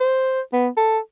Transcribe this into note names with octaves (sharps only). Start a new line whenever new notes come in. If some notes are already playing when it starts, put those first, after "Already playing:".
C5
B3
A4